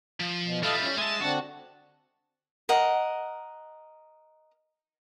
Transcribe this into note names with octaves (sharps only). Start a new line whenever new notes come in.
F3
B2
G3 E4 F4 A4 D#5 F5
C#4
G#3 E5 G#5 A5
D3 C4 D4 F#4 F#5
A#4 D#5 F#5